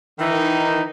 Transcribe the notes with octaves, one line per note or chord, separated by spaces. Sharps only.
D#3 E3 D#4